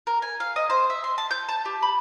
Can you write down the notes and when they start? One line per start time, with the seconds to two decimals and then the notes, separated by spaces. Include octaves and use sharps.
0.07 A#4
0.22 G#5
0.40 F5
0.56 D#5
0.70 C5
0.90 E5
1.04 C6
1.18 A5
1.31 G6
1.49 A5
1.65 G4
1.83 B5